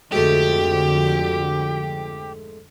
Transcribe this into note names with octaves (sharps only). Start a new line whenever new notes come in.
F2 G#2 D3 F3 A3 F#4 G4